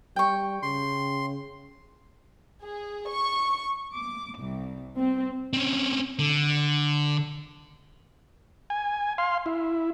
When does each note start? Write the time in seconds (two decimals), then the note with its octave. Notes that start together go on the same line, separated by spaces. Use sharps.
0.16 G3 G5 C#6
0.63 C#3 C6
2.63 G#4
3.09 C#6
3.94 D6
4.41 C2
4.97 C4
5.53 C4 C#4
6.19 D3
8.70 G#5
9.18 F5 C6
9.46 E4